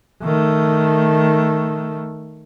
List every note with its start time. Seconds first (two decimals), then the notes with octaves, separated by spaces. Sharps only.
0.23 D#3 A3